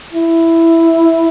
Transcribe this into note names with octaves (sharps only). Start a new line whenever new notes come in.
E4